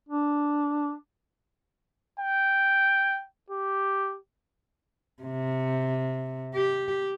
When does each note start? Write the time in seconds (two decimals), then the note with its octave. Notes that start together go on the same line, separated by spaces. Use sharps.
0.09 D4
2.20 G5
3.50 G4
5.23 C3
6.55 G4